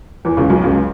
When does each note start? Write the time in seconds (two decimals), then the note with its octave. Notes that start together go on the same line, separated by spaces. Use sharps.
0.25 E2 E3
0.37 C#2 C#3
0.50 B1 B2
0.64 C#2 C#3